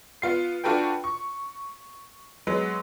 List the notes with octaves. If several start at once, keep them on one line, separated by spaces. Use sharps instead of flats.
B3 F4 C7
D4 F4 F#4 A4 B4 G5
C#6
F#3 G#3 B3